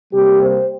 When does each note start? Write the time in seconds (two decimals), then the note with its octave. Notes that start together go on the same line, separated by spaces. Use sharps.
0.13 C3 G3 A#3 G4
0.42 C5